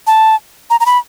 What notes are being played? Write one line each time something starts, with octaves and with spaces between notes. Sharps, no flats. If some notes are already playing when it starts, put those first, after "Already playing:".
A5
A#5
A#5
B5